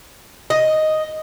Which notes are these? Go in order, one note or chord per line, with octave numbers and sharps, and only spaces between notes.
D#5